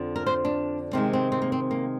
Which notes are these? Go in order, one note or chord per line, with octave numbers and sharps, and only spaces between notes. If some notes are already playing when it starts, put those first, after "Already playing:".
Already playing: F2 D3 F3
A#4
C5
D4
C3 D#3 G#3 C4
C4
C4
A#3
C4
A#3